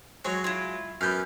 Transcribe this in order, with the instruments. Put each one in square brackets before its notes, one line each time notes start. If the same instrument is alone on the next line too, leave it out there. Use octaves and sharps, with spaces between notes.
[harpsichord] F#3 G#3 [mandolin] C#5
[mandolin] E4 F4
[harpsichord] F#2 B3 [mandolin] F6 G6